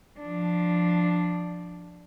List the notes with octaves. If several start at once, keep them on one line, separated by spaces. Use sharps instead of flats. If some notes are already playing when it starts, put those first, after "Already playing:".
F3 D4